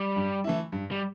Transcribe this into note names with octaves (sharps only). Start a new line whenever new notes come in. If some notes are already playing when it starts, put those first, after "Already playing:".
Already playing: G3
G2
E3 A3 E4
G2
G3